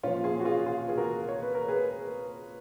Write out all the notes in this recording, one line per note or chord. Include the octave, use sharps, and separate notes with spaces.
A#2 F3 C#4 F4
F4 G#4
F#4
F4 G#4
F4 G#4
G#4
F#4 A#4
C#5
B4
A#4
G#4 B4